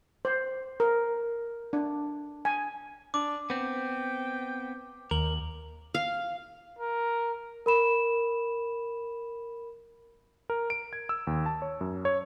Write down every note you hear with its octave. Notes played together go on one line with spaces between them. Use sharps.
C5
A#4
D4
G#5
D4 D6
B3 C4 G5
D#2 A#4 F#7
F5
A#4
A#4 B5 E7
A#4
D7
G#6
E6
D#2
A5
C#5
F#2
C#5